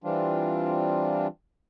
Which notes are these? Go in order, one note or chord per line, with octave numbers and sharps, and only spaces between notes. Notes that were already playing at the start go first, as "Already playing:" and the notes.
E3 G3 C4 D4 F4